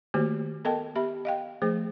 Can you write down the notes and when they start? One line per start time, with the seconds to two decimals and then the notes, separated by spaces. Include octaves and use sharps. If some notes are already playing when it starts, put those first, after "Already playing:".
0.14 D#3 A3 A#3 F#4 G4 C5
0.65 B3 A4 A#4 D#5 G5 A5
0.95 B3 G4 E5 B5
1.25 D#5 F5 G5
1.62 F3 A3 G#4 C5